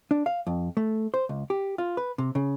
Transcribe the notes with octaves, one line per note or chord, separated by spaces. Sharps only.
D4
F5
F2
A3
C5
C#2
G4
F4
B4
C3
C#3